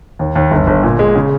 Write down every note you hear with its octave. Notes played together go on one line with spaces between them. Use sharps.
D#2
D#2
G1
G1
A#2
G#3
C#3